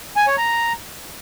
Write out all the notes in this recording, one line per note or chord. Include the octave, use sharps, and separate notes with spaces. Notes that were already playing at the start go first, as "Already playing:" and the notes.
G#5
C#5
A#5